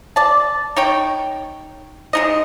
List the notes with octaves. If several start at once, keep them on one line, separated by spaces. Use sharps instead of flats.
D5 A5
D#4 C#5 G5
G#3 D#4 D#5